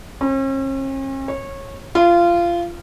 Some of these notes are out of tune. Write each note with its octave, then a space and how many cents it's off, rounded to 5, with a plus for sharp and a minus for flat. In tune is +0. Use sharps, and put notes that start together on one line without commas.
C#4 -45
C#5 -20
F4 -20